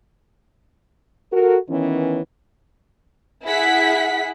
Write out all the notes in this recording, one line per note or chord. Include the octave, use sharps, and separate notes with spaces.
F#4 A4 A#4
D#3 E3 B3 C#4
E4 G#4 F#5 B6